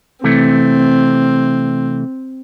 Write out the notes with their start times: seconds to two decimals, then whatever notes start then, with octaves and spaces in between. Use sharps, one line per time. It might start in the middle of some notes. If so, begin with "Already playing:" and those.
0.24 C3 E3 A3 C4